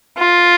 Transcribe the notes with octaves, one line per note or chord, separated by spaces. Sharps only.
F4